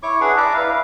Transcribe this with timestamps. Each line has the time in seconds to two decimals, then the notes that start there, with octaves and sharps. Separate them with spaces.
0.03 E4 C#5 C#6 D6
0.21 D4 G#4 B4 F#5
0.37 D5 E5 A#5 D6
0.53 E4 B4 F5
0.69 F5